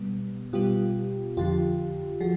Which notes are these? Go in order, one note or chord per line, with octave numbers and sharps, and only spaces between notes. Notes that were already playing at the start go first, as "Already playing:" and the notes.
Already playing: B2 G3 B3
B2 G3 B3 F4 G4
F2 D3 F3 F4 G4
F3 F#4 G#4